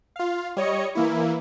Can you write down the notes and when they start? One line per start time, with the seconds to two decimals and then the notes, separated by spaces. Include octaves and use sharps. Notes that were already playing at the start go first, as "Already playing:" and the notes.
0.16 F4 F5
0.57 G3 C#5 D#5 C#7
0.95 E3 A#3 E4